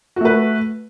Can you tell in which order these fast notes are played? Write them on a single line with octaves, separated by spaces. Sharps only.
F#4 A3 B4